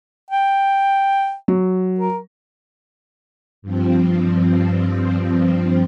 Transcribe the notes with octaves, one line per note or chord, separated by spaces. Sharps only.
G5
F#3
A#4
G2 F3 C4